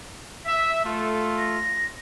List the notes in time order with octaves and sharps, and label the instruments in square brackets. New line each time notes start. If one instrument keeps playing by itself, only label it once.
[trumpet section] E5 [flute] B6
[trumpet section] A3 F4 [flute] A4
[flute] A#6